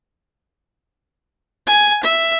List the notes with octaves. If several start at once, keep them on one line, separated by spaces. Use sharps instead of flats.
G#5
E5